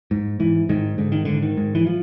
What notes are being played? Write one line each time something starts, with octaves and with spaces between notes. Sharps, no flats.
G#2
G#2 E3
G#2 D#3
G#2 D3
D#3
G#2 D3
D#3
G#2
E3
F3